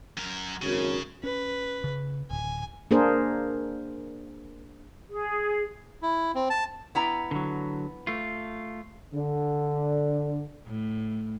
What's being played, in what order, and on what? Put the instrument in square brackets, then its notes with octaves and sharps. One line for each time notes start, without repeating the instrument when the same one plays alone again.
[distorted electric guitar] F#2 A#4
[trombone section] G#1 F#2 [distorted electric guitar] C#3
[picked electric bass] C#4 [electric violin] B4
[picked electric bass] C#3
[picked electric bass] D1 [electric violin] G#5
[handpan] A#3 D4 G#4 A#4 C5
[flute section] G#4
[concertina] E4
C4
A5
[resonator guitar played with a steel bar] B3 E4 A#5
[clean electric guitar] D3 F#3
A3 F4
[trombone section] D3
[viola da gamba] A2